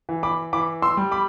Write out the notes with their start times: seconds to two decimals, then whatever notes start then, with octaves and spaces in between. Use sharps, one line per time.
0.09 E3
0.23 B5 D6
0.53 E3 B5 D6
0.82 C6 E6
0.97 G3
1.12 B5 D6